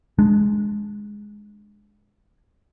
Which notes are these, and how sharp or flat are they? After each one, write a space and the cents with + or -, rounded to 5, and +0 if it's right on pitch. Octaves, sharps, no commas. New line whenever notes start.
G#3 +0 D4 +0